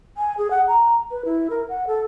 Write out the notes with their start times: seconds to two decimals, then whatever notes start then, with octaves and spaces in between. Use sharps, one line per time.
0.17 G#5
0.38 G#4
0.51 F#5
0.68 A#5
1.11 B4
1.25 E4
1.50 A#4
1.69 F#5
1.87 A4